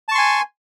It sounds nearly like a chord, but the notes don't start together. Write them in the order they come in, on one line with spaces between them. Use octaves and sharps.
A5 C#6 C6 G#5